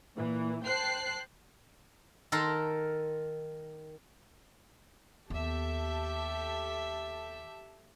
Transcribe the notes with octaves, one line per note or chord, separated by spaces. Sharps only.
A#2 E3
C5 G5 A5 F#6 C7
D#3 A4 A#4 C6
D#2 B3 G4 A4 E5